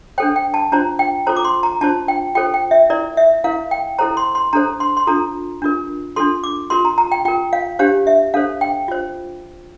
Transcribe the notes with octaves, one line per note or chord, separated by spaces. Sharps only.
D4 A4 C5 G5
G5
A5
D4 F4 C5 A#5
G5
F4 A4 C5 A#5
D6
C6
A#5
D4 F4 C5 A5
G5
F4 A4 C5 G5
G5
E5
E4 A#4 D5
E5
E4 A#4 F5
G5
E4 A4 C5 A#5
C6
C6
D4 A4 C5 A#5
C6
C6
D4 F4 A4 A#5
D4 F4 A#4
D4 F4 A4 C6
D6
F4 A#4 C6
A#5
A#5
G5
F4 A#4 G5
F5
D4 G4 C5 F5
E5
D4 A4 C5 F5
G5
F4 C5